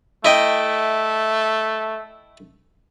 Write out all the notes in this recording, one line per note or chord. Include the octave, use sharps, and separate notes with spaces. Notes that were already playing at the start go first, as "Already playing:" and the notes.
A3 E4 D#5 G5